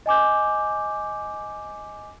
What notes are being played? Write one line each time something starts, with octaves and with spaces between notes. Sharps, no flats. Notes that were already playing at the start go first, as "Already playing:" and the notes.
D#5 G#5 D6 G6